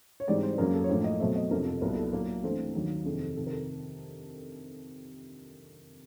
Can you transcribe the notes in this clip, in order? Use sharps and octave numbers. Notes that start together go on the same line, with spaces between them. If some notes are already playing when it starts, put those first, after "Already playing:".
C#5
G#2 E3 G3 C4 D5
C5
F#2 C#3 F#3 A#3 A#4
A4
C#5
A2 F3 A#3 C5
D#5
B2 F#3 A3 C4 E5
D#5
F2 C3 F3 A#4
A4
C2 A#2 F#3 B3 A#4
A4
A#2 F#3 A#3 A4
G2 E3 A3 C4 A4
D#2 D#3 F#3 A#3
F2 C3 D#3 G#4
A4
F2 C3 D#3 A4
A#4
A4